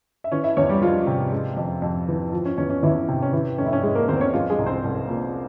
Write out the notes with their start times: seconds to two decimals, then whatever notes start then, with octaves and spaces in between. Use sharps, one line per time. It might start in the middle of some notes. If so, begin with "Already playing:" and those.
0.24 E5
0.32 E3 C#4 C#5
0.44 E4 E5
0.57 E2 C#4 C#5
0.69 G3 G4
0.82 F3 G#3 F4
1.07 C3
1.32 G#3
1.57 F2
1.82 F2
2.08 E3
2.32 F3
2.45 C#4
2.58 E2 C#4
2.70 C#4
2.83 E2 E3 E4
3.08 C3
3.22 C#4
3.33 E3 E4
3.58 F1 C#4
3.66 E4
3.73 C#4
3.83 G#3 G#4
3.95 A#3 A#4
4.08 E2 C4 C5
4.21 C#4 C#5
4.33 F3 G#3 F4
4.50 G#3 G#4
4.58 C2
4.66 C4 C5
4.84 C2
5.08 A#2